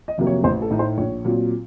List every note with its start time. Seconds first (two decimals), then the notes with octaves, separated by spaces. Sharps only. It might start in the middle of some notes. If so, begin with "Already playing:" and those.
0.08 D#5
0.18 F2 C3 F#3 A#3
0.27 C#5
0.44 A1 C5
0.62 A4
0.70 A2 A3 D#4
0.79 C5
0.98 A#1 C#5
1.25 A#2 F#3 C4